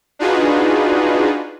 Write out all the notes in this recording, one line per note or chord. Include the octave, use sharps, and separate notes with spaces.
D4 D#4 F4 F#4 G#4 B4